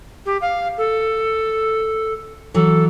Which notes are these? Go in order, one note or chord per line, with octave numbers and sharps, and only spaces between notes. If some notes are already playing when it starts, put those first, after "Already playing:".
G4
F5
A4
E3 F#3 A4